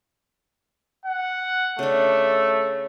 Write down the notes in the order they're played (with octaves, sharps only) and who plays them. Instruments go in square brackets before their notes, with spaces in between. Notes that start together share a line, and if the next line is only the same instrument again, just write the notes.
[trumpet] F#5
[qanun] C#3 D4 [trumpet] A3